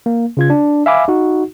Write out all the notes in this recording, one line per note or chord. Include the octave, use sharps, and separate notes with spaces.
A#3
C#3 F4 G#6
D4
E5 F5 G#5 B5 D6
D#4 F#4